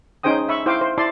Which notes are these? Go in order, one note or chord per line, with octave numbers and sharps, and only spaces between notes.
C#4 D#4 G#4 C5 G5 D#6
E5 B5 C#6
E4 C5 F5 G5 D6
C5
E4 D5 A5 C6